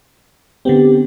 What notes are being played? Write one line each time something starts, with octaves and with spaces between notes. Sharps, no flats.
D3 B3 C4 G4